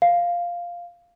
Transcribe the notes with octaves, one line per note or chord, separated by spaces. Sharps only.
F5